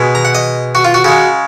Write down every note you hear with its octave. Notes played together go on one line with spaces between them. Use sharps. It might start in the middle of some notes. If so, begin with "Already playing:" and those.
Already playing: B2 G#3
A#5
F#5
D#5
F#4
F4
F#4
C#3 G#3 F#4